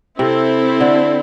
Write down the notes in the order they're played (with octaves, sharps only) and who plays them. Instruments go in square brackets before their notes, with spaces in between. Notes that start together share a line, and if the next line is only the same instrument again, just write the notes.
[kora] C3 [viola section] C4 E4 A4
[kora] D3